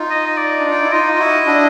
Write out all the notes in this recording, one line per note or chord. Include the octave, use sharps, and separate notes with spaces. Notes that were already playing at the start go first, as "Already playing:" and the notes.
Already playing: D#4 F4
D#5
D#5
D5
D4
D#4
E4
D#4 F4 D#5
F4
E4 F#4
D4 E4